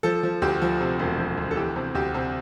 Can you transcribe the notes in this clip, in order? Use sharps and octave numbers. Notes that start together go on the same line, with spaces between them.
F3 A4
F3
D2 G4
F3
C3
E1
F3
D2
A4
E3 G4
C3
D2 G4
C3